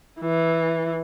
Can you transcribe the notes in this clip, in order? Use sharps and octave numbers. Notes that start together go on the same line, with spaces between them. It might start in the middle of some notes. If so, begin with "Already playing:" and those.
E3